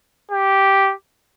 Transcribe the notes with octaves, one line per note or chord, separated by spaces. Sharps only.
G4